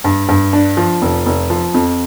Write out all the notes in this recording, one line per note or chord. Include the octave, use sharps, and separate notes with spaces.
G2
G2
D4
F3
F1
F1
F3
F2